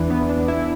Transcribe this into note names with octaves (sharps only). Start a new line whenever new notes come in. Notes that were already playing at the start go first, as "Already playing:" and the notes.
Already playing: E2 E3 D4
B3
D4
E4